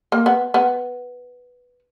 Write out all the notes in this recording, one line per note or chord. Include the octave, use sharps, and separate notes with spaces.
A#3
B3
B3